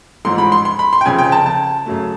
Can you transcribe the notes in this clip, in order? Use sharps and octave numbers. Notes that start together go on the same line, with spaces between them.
A1 G#2 F3 C6
B5
C6
C6
B5
C6
G5
F1 F2 C#3 G#5
G5
A5
A5
F#2 C#3 F#3 A3